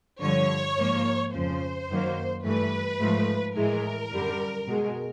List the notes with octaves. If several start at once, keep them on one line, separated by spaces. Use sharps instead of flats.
G2 D3 F3 C#5
G#2 F3 A#3
F2 C#3 F3 C5
F#2 D#3 F#3 A#3
G2 E3 A3 B4
G#2 F3 A3
A2 E3 G#3 A#4
F#2 D3 G3
B2 G#3